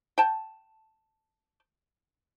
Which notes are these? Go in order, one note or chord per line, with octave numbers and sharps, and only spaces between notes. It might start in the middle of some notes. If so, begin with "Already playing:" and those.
G5 A5